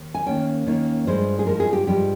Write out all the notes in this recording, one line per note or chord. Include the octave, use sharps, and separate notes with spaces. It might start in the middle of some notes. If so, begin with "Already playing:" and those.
Already playing: D#2
G#5
D#2 D#3 A#3 C#4 G5
D#2 D#3 A#3 C#4
G2 F3 G#3 C5
G#4
G2 F3 G#3 A#4
G#4
G4
G2 F3 G#3 G4